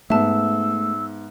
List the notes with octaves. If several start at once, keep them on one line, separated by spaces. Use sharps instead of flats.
G#2 A3 B3 E5 A5 E6